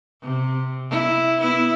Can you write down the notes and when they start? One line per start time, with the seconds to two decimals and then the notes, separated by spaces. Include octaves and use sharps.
0.22 C3
0.90 E4
1.40 B3 E4